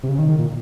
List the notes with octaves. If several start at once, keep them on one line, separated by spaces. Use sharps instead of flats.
C3
C#3
D#3
D#3
A#2